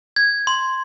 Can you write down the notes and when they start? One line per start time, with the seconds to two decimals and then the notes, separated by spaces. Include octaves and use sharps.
0.16 G#6
0.47 C6